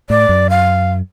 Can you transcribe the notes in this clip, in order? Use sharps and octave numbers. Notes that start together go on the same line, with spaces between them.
A2 D5
F#2
F5